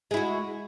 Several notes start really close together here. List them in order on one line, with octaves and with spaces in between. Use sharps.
G#3 E4 F#4